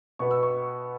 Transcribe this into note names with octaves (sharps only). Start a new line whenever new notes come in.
B2 B3 C#6
E6
C#6